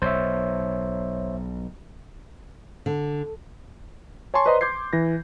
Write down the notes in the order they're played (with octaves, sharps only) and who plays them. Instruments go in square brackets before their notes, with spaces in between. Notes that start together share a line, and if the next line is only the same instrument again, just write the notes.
[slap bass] B1 [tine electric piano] C5 C#5 E5
[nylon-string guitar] D3
[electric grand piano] C#5 G#5 A5 C6 C#6
B4 C5 D5 D#5 A#5 C6
C6 D6 G6 G#6 C7
E3 A#6